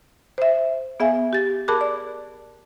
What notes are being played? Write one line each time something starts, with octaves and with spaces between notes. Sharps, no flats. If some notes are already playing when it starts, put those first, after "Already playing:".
C5 E5
B3 G#4 E5 F5 G#5
G4 A6
G#4 A#4 A5 B5 D6 F#6
D5